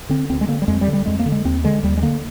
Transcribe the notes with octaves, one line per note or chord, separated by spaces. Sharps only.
D3 C4
D2 C4
G#3
D3 A#3
G3
F2 G#3
G3
D3
G3
F2 G#3
A#3
D3
G#3
D#2 C4
D3 G#3
D#2 G3
G#3
D3 A#3